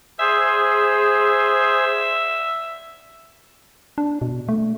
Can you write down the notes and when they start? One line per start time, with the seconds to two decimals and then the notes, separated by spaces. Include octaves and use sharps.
0.19 G#4 C5 E5
3.98 D4
4.22 B2
4.49 A3